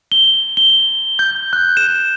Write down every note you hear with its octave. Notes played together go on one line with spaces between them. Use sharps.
G7
G7
G6
F#6
E7